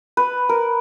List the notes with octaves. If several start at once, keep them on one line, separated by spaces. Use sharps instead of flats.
B4
A#4